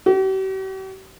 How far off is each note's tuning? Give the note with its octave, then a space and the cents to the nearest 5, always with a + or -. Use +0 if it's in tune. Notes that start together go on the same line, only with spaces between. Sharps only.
G4 -45